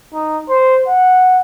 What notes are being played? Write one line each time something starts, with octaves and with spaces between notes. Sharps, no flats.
D#4
C5
F#5